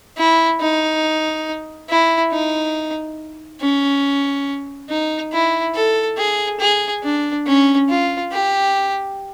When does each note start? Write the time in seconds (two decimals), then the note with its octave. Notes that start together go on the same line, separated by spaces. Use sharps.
0.17 E4
0.60 D#4
1.90 E4
2.32 D#4
3.61 C#4
4.89 D#4
5.32 E4
5.75 A4
6.18 G#4
6.60 G#4
7.03 D4
7.46 C#4
7.89 F4
8.32 G4